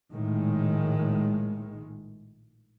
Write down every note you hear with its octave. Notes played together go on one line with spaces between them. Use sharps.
A#1 A2 D#3 G#3